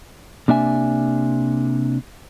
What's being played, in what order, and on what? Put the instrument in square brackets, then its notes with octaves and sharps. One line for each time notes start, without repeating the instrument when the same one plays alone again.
[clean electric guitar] C3 A#3 D4 E5 G#5